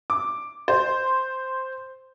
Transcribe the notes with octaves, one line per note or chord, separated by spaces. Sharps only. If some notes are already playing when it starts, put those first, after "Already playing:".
D6
C5